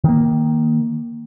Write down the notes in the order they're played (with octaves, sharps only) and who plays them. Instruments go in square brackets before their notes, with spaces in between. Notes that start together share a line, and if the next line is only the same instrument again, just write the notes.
[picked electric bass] D#3 A#3